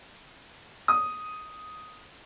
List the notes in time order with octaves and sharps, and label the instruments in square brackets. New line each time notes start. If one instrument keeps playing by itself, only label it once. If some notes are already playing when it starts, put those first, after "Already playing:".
[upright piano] D#6